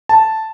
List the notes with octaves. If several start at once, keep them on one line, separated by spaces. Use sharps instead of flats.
A5